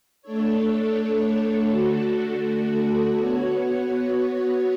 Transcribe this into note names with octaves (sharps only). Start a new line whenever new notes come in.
A3 D4 A4 C#5
D3 A3 D4 F#4 A4
B3 F#4 C#5